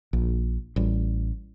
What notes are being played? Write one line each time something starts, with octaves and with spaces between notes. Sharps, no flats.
A#1
A1 G3